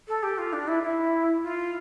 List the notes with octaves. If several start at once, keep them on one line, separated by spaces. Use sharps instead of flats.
A4
G4
F4
D4
E4
E4
F4